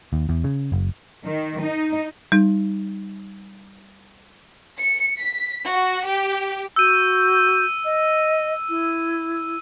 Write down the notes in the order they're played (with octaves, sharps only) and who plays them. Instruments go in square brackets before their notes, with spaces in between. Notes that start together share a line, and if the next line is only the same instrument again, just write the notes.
[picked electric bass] D#2
E2
C#3
F#1
[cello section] D#3
D#4
[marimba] G3 D#4
[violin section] C#7
B6
F#4
G4
[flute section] F#4 G6 [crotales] E6 D#7
[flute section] D#5
E4